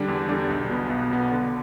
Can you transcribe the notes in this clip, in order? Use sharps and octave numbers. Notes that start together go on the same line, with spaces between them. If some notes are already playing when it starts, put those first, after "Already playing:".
Already playing: D3 G3 D4
E2
D3 G3 D4
B1
B2 B3
B1
B2 B3
D3